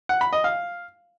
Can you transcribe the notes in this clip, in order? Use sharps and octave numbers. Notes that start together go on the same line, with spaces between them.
F#5
B5
D#5
F5